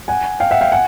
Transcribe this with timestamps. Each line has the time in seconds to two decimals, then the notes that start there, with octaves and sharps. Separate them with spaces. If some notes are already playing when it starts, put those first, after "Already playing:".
0.08 F#5 G#5
0.40 F5 G5
0.51 E5 F#5
0.61 F5 G5
0.72 F#5 G#5